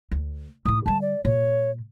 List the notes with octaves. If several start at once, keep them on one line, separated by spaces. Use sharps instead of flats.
D2
A2 E4 D#6
D3 G3 A5
D5
A#2 G3 C#5